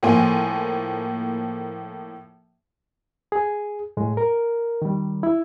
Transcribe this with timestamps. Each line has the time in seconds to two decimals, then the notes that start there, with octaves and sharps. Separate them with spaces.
0.03 A2 F3 A#3 G#5 C6
3.32 G#4
3.97 A2 G#3
4.17 A#4
4.82 D#3 G3
5.23 E4